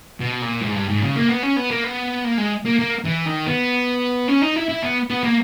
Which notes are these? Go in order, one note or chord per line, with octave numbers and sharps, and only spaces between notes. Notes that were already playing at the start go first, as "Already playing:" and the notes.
B2
A#2
G#2
G2
G#2
C#3
A#3
B3
C#4
B3
A#3
B3
A#3
G#3
A#3
A#3
E3
D#3
B3
C#4
D#4
E4
E4
B3
B3
A#3